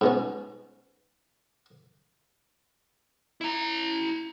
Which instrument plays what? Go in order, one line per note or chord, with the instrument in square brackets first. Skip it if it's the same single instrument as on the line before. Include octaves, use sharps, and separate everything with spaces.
[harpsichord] G#2 B2 C#4
[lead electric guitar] E4 A#5